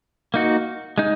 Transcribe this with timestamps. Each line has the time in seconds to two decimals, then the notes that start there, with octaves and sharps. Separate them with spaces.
0.34 A#3 D#4 F#4
0.98 G#3 D#4